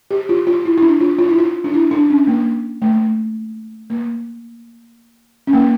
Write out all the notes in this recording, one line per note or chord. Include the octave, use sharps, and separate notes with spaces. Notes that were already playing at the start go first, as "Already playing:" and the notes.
G4
F4
F4
E4
E4
D4
F4
F4
E4
F4
D4
E4
D4
C#4
A#3
A3
A#3
C#4
A#3